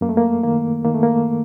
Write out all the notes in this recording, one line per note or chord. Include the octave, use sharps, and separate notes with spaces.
F#2 A#3
A3
A#3
D#3 A#3
D#3 A#3
A3
A#3